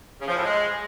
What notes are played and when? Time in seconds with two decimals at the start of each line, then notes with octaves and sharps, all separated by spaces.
0.20 C#3
0.28 F3
0.36 A2
0.44 G#3